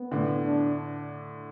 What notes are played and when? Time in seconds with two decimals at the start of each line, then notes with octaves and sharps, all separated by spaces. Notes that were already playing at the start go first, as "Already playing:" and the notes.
Already playing: B3
0.11 A2 D3
0.44 D4